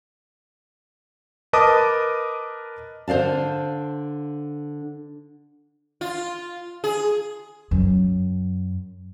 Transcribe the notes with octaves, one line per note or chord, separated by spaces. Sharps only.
A#4 B4 D#5 A5 D6 D#6
D3 C5 D5 F5 A5
F4
G#4
F#2